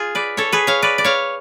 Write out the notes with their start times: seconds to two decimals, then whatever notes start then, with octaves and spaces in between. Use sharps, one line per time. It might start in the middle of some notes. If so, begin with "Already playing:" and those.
Already playing: F4 G#4
0.15 B4 D5
0.37 A4 C#5
0.52 G#4 B4
0.67 C#5 F5
0.82 B4 D5
0.98 D5
1.04 C#5 F5